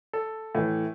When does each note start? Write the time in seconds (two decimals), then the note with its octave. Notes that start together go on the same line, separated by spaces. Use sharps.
0.13 A4
0.55 A2 E3